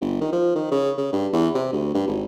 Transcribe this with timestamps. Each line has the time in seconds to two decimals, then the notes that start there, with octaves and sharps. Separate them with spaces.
0.01 G1
0.21 D#3
0.33 F3
0.55 D#3
0.71 C#3
0.98 C#3
1.13 G2
1.33 E2
1.55 C3
1.73 D2
1.94 G2
2.08 G#1